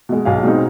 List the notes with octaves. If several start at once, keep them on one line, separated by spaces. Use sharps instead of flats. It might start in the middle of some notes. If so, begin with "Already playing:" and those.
B2 G#3
B1 F5 G#5
B2 G#3 C4 D#4